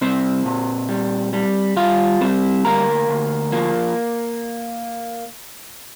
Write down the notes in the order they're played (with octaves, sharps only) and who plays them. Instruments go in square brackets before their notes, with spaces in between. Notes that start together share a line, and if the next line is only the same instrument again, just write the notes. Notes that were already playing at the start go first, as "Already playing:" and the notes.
[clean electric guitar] C2 C4 C5
A#2
G3
G3
G3 F4 F5
G3 C4 C5
D2 A#3 A#4
D2
F3 A#3